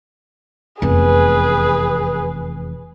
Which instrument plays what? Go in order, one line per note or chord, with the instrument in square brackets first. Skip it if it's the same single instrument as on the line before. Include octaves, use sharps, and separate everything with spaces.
[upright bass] F1 E2 [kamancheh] G#4 B4